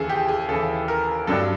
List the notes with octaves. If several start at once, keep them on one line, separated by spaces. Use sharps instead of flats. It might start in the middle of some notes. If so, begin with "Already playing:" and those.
Already playing: D#2 C#3 E3 G#4 A4
G4
G#4
D#2 C#3 E3 A4
A#4
G2 D3 F#3 A4